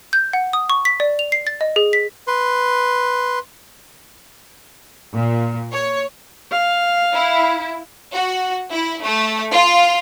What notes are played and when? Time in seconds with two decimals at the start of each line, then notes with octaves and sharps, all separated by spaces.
0.13 G6
0.33 F#5
0.53 D#6
0.70 C#6
0.85 B6
1.00 D5
1.19 F7
1.32 C7
1.47 A6
1.61 D#5
1.76 G#4
1.93 B6
2.27 B4 C6
5.14 A#2
5.72 C#5
6.52 F5
7.14 E4
8.12 F#4
8.71 E4
9.03 A3
9.53 F4